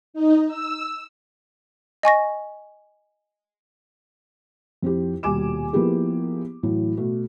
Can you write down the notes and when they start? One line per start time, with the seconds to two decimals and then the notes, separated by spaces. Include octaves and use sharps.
0.14 D#4
0.47 E6
2.03 D#5 G#5 C#6 A#6
4.82 F2 C4 E4 G4
5.23 D#1 B2 G3 G#5 D6 E7
5.73 F3 A#3 B3 E4 G4 G#4
6.63 A2 E3 F#3
6.97 B2 A3